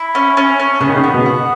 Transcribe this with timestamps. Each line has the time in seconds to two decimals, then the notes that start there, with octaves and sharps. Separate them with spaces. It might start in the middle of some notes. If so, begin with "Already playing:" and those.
Already playing: E4
0.15 C#4
0.37 C#4
0.60 C#4
0.81 C#3 B3
0.89 D#3
0.96 C#3
1.04 B3
1.14 B2
1.26 F#4